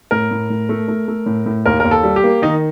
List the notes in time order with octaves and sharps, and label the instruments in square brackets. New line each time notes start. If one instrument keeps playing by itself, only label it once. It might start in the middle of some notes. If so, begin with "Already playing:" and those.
[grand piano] A2 [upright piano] A#4
[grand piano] A2
A2
A3
A3
A3
A2
A2
[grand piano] D#2 [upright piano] A#4
[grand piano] D#2 [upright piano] A#4
[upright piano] A4
[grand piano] G3
[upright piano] G4
[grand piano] A#3
[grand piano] D#3 [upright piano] D#4